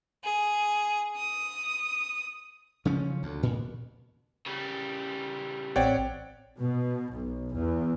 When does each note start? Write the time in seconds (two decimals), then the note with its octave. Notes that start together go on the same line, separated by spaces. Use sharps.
0.24 G#4
1.17 D#6
2.85 C#3 F3 C#4
3.23 D2
3.43 A#2
4.46 C#3 G3
5.76 A1 C4 C#5 D5 F#5 G5
6.57 B2
7.10 B1
7.53 E2